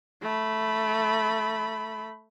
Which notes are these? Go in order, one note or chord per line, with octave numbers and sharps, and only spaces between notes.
A3 B5